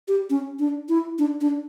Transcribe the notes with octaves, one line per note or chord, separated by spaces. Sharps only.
G4
C#4
D4
E4
D4
D4